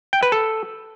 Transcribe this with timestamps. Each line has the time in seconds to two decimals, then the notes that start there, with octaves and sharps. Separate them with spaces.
0.13 G5
0.23 B4
0.32 A4